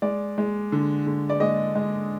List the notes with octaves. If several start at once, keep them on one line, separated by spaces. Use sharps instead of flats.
G#3 D5
G#3
D3
D3
D5
G#3 D#5
G#3